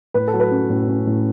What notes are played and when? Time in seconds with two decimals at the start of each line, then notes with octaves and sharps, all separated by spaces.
0.14 A2 B4
0.28 A4
0.33 F#3
0.40 B4
0.51 C#4
0.70 A2
0.88 C#4
1.07 A2